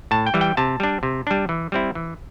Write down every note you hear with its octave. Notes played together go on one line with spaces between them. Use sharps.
A2 A5
G5
E3 G3
G5
C3 A5
G3 D4
C3
G3 D4
E3
G3 C4 E4
E3